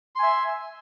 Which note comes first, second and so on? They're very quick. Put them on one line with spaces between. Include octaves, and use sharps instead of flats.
C6 G#5 E5